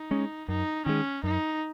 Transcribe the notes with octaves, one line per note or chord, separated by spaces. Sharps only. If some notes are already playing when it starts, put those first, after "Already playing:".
Already playing: D#4
G#3 C#4
F#2 D#4
D#3 G#3 C#4
F#2 D#4